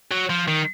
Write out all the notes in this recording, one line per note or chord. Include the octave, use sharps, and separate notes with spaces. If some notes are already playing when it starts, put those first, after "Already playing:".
F#3
F3
D#3